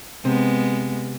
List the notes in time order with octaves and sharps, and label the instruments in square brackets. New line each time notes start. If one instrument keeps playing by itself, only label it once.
[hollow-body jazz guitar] C3 [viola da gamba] G#3 B3